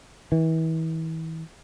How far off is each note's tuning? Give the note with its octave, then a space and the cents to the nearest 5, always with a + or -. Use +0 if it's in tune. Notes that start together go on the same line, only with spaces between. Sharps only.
E3 -35